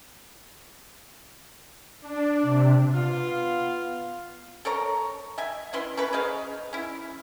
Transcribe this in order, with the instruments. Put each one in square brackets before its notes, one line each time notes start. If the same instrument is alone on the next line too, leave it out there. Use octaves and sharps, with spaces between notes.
[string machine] D4
C3
[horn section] B3 F4 F5
[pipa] A4 A#4 C#5 A#5
D#5 E5 G#5
C#4 E4 B4 C6
C#4 F4 A#4 B4
G#4 C5 D#5 F5
C#4 E4